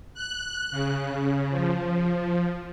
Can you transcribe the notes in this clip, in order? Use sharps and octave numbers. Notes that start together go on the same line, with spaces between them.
F#6
C#3
F3